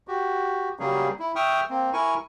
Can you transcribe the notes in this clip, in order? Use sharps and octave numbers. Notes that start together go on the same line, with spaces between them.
F#4 G4
C#3 F#3 G3 A#3 C#4 G#4
E4
E5 G5 C#6 D#6 F6
A#3 C4
E4 A#4 G#5 C#6